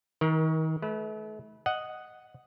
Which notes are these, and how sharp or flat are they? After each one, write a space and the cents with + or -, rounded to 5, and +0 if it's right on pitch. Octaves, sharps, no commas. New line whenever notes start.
D#3 +35 A#4 +20
A3 -40 B4 -15
D#5 +0 F#5 +0